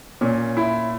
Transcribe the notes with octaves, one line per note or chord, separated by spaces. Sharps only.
A#2 C#4
E4